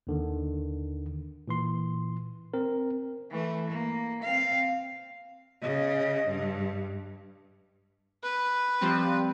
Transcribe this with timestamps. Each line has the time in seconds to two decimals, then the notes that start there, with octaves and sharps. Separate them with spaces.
0.07 D#2 D3 D#3
1.48 A#2 E3 C6
2.54 C4 A#4
3.30 E3 A3
3.70 A#3
4.23 C4 F5
5.62 C#3 D#5
6.28 G2
8.23 B4
8.81 F3 G3 C4